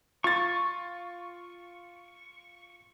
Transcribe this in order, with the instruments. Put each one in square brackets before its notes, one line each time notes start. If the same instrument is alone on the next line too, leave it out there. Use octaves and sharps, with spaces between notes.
[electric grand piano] F4 A6 [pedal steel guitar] C#6